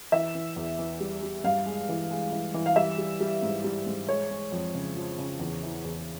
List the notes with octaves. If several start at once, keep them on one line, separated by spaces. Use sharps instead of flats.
E3 E5
E3
E2
E3
G3
G3
G2 F5
G#3
E3
G#3
E3
E3
F5
G3 E5
G3
G3
G#2
G3
G#2
G#3 C#5
G#3
F2
C#3
F3
C#3
E2
E3
E2